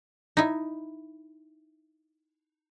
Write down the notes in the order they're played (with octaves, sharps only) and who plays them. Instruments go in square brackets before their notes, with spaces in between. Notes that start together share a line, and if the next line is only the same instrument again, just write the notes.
[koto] D#4 E4